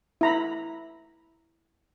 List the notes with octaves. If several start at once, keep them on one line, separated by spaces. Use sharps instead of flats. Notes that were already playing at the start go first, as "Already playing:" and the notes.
E4 A#5 B5